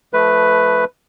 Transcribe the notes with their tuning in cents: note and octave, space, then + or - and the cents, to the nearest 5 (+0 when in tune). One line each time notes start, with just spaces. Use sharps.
F3 +15 A3 -10 B4 +5